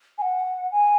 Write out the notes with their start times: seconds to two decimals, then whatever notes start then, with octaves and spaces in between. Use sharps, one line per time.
0.18 G#5
0.21 F#5
0.71 G#5